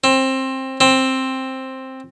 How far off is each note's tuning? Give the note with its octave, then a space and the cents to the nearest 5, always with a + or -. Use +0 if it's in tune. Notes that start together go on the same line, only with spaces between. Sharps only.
C4 +20
C4 +10